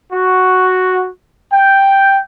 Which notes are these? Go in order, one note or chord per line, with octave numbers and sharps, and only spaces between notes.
F#4
G5